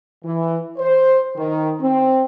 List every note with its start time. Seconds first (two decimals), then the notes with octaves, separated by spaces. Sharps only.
0.24 E3
0.78 C5
1.36 D#3
1.80 C4